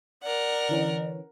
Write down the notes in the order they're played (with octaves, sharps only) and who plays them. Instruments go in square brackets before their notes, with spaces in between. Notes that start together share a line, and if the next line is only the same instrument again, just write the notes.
[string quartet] A#4 F#5 [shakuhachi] D5
[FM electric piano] D3 E3 C#4